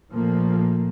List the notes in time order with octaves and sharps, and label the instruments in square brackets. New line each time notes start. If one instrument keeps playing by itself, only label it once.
[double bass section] A#2 F3 A3 A#3